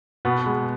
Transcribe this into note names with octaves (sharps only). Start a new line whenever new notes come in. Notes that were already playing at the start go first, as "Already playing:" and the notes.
B2 B3
G#3